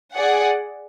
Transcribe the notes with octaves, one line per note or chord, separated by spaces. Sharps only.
G#4 D5 F#5